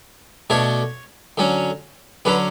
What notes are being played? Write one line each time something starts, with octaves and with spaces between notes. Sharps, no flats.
B2 A3 D4 C#5
D3 F#3 C#4
D3 F#3 C#4 B4